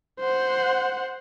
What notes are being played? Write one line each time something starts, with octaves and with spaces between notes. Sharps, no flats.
C5 F#5